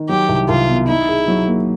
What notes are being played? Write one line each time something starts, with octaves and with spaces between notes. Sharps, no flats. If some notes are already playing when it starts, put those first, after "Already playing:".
Already playing: D#3
F#3 G4
C2
C2 F4
B2
D#4 E4
G#4
F#3
A#3